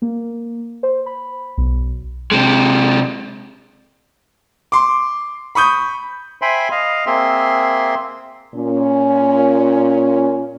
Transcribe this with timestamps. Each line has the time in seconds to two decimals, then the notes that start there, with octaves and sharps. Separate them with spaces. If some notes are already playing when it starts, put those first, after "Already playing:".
0.02 A#3
0.83 C5
1.06 B5
1.57 B1
2.32 C3 G#3
4.72 C6 D6
5.55 B5 C#6 D#6 G6
6.42 C5 E5 G5 G#5 B5 C6
6.71 D#5 F5
7.06 A#3 C4 G#4 E5 C6
8.54 A#2 C#4